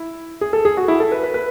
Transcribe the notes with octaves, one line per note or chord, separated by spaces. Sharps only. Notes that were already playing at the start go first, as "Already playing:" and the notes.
Already playing: E4
G#4
A4
G#4
F#4
E4
A4
B4
B4
B4